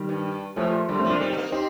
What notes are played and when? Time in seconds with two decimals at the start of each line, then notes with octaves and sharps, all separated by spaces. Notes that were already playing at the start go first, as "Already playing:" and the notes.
Already playing: D#3 G3
0.09 G2
0.56 A2 F3 A3
0.67 A#2
0.89 D3 G3 A#3
0.99 A3 C4
1.04 F3
1.10 A#3 D4
1.20 G3 C4 D#4
1.33 A3
1.37 A#3
1.52 C4 D#4 G4